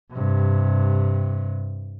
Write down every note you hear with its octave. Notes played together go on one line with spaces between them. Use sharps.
G2 C3